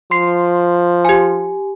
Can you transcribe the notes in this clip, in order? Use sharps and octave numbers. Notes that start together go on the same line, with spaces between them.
F3 C6 C7
G4 G#5